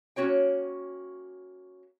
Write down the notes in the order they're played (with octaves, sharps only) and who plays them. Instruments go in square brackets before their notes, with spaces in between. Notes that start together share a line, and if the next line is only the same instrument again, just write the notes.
[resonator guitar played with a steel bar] A#3 C#4 F#4 C#5 G5